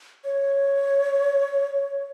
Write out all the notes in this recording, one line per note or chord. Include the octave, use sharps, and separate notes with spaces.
C#5